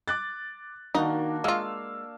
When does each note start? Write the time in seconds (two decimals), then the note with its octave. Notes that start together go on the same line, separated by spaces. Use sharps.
0.08 D6 F#6 A6
0.95 D#3 A#3 D4 D#4 F#4
1.44 G#3 F4 F5 E6